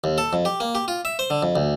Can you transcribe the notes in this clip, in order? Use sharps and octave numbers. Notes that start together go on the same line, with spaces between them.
D#2
A4
F2
G4
A#3
G4
F4
E5
C5
D3
F2
D2